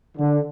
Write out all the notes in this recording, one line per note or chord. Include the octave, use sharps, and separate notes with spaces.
D3